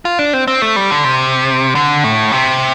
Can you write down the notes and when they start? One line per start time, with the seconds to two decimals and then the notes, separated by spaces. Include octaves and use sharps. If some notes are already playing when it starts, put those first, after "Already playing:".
0.05 F4
0.19 D4
0.33 C4
0.47 C4
0.62 A3
0.76 G3
0.91 D3
1.04 C3
1.75 D3
2.04 A2
2.32 C3